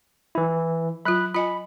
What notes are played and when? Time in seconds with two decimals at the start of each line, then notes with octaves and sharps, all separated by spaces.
0.35 E3 E4
1.05 F#3 F4 B5 F#6
1.34 F4 D#5 G#5 B5